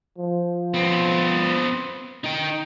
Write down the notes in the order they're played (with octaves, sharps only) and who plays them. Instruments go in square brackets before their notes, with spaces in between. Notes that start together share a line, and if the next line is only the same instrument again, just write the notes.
[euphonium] F3
[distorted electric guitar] B3 C4
D#4 G5